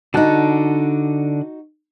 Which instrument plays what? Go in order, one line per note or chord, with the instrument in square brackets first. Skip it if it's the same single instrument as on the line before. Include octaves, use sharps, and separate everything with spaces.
[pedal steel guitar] D3 A5 F#6 [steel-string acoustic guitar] D#4 F#4